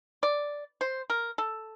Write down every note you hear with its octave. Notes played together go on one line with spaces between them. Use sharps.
D5
C5
A#4
A4